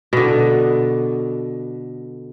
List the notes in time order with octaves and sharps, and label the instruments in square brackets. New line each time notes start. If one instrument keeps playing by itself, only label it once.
[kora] B2 D3